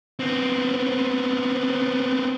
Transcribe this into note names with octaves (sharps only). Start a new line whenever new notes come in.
B3 C4